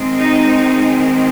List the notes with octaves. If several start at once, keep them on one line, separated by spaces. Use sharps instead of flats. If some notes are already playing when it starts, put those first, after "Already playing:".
Already playing: D#3 G#3 C4
D#4